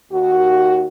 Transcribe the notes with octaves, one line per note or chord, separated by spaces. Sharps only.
D#2 F#4